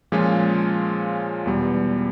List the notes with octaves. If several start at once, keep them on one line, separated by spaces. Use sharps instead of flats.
A#2 F3 G#3 C#4 F4
E2 B2 G3